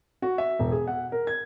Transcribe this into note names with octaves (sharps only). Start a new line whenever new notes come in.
F#4
E5
E1
G#4
F#5
A#4
G#6